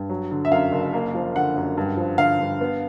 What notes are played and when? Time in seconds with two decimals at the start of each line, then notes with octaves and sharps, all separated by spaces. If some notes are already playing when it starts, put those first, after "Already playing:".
Already playing: G2
0.09 F#3
0.31 D3
0.45 E5
0.52 F#2 F5
0.72 F#1
0.93 A#3
1.15 F3
1.35 D3 F#5
1.57 F#2
1.77 G2
1.97 F3
2.18 D3 F5
2.40 G2
2.61 B3